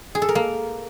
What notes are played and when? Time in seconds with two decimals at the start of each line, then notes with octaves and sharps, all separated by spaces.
0.15 G#4
0.22 A4
0.29 A#4
0.35 A#3